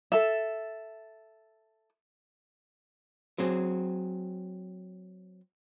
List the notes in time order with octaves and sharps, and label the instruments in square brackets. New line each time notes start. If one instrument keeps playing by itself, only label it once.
[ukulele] A4 E5
[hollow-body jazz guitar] F#3 C4 G#4